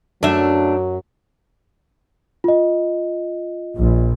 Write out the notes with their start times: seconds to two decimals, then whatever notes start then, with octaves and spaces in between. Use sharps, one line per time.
0.23 F#2 F#3 A3 D4 E5
2.44 F4 D#5
3.76 A#1